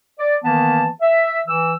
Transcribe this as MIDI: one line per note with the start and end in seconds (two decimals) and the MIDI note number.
0.19 0.35 74
0.43 0.88 51
0.43 0.88 52
0.43 0.88 58
0.43 0.88 59
0.43 0.88 81
1.02 1.41 76
1.47 1.73 52
1.47 1.73 88